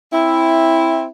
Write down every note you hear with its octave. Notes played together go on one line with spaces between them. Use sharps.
C4 E4